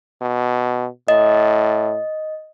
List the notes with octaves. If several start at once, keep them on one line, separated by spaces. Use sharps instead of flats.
B2
A2 D#5